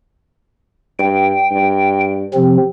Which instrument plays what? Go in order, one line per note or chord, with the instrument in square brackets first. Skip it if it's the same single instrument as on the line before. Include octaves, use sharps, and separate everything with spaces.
[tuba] G2 [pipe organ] G5
[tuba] G2
[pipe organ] C3 F3 C4